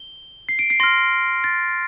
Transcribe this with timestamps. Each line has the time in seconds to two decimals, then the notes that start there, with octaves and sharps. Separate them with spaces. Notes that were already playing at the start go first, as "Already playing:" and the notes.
Already playing: G7
0.49 C7
0.59 D7
0.70 C7
0.80 C6 F6 A#6
1.44 A6